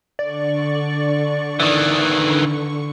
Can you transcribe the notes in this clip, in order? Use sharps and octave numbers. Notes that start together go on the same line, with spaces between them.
D3 D5 C#6
D#3 E3